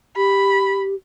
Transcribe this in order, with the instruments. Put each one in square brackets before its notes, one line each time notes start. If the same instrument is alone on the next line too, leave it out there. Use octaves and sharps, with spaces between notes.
[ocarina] G4 [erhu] B5